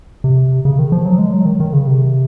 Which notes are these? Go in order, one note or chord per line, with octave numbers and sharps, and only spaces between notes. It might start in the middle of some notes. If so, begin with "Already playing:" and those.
C3
C#3
D#3
F3
F#3
G#3
F#3
D#3
D#3
C#3
C3